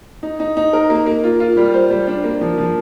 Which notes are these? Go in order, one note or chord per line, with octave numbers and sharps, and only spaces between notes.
D#4
D#4
D#4
A#4
A#3
A#3
F4
F4
G3
C5
G3
D4
A#3
F3
F3